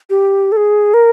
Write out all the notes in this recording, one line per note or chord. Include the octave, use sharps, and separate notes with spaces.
G4
A4
G#4
A#4